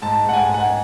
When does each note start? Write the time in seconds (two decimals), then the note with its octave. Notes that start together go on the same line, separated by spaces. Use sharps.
0.02 G#2 A5
0.26 G#2 F#5
0.33 G#5
0.48 G#2
0.54 F#5
0.65 G#5